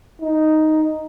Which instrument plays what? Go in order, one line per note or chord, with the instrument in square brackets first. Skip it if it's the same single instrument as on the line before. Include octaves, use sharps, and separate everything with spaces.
[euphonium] D#4